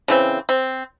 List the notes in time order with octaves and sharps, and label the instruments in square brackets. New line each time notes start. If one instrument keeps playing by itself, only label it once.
[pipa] C#3 E3 C4
C4